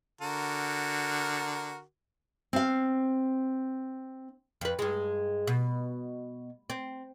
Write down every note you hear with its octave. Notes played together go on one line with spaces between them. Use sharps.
D3 F#4 A#4
C4 F5
F2 B4
G2 G#3
B2
C4